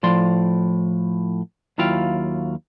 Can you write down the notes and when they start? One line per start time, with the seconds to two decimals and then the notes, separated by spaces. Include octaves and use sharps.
0.03 A2 F3 D5 C6
1.78 D#2 F#3 E4 F4 F5 G5